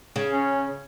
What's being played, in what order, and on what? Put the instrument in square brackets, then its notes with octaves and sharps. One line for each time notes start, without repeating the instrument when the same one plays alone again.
[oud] C#3
[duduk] C#4